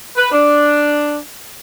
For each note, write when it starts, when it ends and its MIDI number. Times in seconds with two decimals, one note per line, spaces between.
0.17 0.31 71
0.31 1.17 62